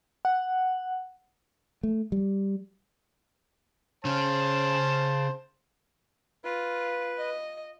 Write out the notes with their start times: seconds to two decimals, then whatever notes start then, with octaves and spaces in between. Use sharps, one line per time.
0.25 F#5
1.83 A3
2.12 G3
4.05 C#3 C#4 C5 A5
6.45 F4 B4
7.18 D#5